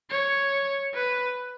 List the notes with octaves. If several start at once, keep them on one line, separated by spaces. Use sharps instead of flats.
C#5
B4